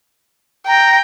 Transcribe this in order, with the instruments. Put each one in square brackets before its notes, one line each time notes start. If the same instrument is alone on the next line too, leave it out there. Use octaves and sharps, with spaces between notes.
[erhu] G5 [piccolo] A#5